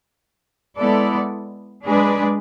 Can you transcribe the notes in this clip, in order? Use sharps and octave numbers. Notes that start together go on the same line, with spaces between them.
G#3 B3 E4 A4 D5
G#3 D4 G#4 B4 D5